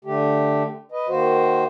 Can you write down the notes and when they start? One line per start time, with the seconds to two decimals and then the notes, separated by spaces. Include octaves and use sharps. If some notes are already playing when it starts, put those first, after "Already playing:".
0.05 D3 A3 G4
0.92 B4 D#5
1.08 D#3 A#3 F#4 C5